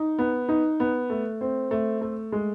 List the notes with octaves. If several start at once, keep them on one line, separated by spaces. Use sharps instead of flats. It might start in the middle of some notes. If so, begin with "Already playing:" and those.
Already playing: D#4
B3
D#4
B3
A3
C4
A3
A3
G#3